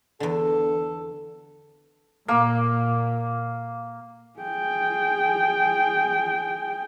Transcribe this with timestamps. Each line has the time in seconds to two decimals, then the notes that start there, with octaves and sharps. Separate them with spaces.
0.20 E2 D3 A4
2.28 A#2 A#3
4.40 G#4 G5